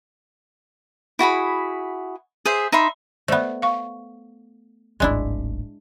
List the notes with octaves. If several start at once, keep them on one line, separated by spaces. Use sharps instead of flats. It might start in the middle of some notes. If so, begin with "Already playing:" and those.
E4 F#4 G#4 B5
G#4 C5 E5
D#4 E5 B5 C6
A3 B3 C5 D5 E5
F5 C#6
D1 G#1 G#3 D4 E4